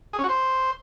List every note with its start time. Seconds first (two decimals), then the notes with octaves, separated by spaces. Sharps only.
0.13 G#4
0.19 C#4
0.24 F#4
0.29 C5